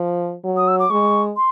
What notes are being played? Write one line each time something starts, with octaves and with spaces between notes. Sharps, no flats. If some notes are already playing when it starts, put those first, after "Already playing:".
Already playing: F3
F#3
D#6
E6
D6
G#3 C#6
C6